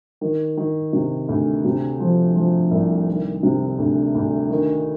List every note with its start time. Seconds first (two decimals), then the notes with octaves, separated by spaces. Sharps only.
0.21 D#3
0.57 D#3
0.93 C3
1.29 D2
1.65 C3
2.00 F3
2.36 F3
2.71 C2
3.07 D#3
3.43 C3
3.78 D2
4.15 D2
4.50 D#3